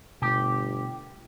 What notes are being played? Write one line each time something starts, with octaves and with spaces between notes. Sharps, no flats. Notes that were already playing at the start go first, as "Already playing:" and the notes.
G1 B2 A3 G4